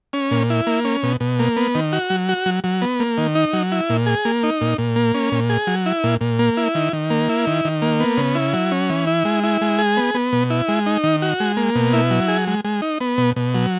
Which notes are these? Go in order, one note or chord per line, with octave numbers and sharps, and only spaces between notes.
C#4
A#2
E4
A#3
C#4
B2
B2
A#3
B3
D#3
F#4
F#3
F#4
F#3
F#3
B3
A#3
D#3
D#4
F#3
E4
A#2
G#4
A#3
D#4
A#2
A#2
A#3
C#4
A#2
G#4
F#3
E4
A#2
A#2
A#3
E4
D#3
D#3
A#3
E4
D#3
D#3
A#3
B3
C#3
E4
F#3
C#4
E3
E4
G#3
E4
G#3
G#4
B3
B3
B2
E4
G#3
D#4
D#3
F#4
G#3
A#3
B2
E4
F#3
G#4
G#3
G#3
D#4
B3
B2
B2
F#3